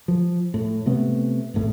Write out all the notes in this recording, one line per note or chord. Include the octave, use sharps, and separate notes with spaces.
F3
A2
C3 A3 B3
D#1 G#1 A2